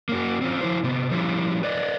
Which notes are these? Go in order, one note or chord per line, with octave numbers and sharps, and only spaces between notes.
A#3 C#4 F#4
C4 C#4 F4
F3 E4 C5
C3 B3
F3 G3 C#4 E4
B4 D5 D#5